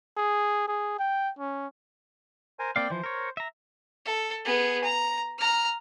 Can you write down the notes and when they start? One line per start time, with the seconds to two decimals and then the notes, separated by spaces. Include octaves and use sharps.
0.17 G#4
0.68 G#4
0.99 G5
1.39 C#4
2.59 A#4 C5 G#5
2.76 A#3 C4 D5 F5 G5
2.90 E3 F3 C5
3.04 A#4 C#5
3.37 E5 A#5
4.06 A4
4.45 B3 G#4
4.84 A#5
5.38 A#5 F6